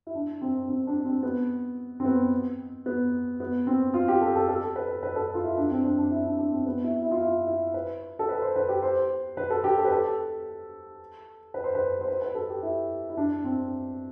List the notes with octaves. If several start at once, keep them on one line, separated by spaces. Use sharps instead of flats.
E4
D4
C4
C4
D4
C4
B3
C4
B3
B3
B3
C4
F4
G4
A4
A4
A4
B4
B4
A4
F4
E4
D4
C4
D4
D4
E4
D4
D4
C4
B3
E4
E4
F4
E4
E4
B4
A4
B4
C5
B4
G4
C5
B4
A4
G4
A4
B4
A4
B4
C5
B4
C5
B4
B4
A4
G4
E4
E4
D4
C4